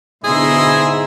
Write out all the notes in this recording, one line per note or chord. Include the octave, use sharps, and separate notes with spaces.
G#2 B2 D3 E4 G#4 D#5 E5 C6